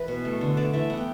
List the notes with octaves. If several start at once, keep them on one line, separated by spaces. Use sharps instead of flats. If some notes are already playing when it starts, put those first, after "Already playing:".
Already playing: E3 B4
B2
A3
D3
A3 D5
E3 E5
B3 F#5
G5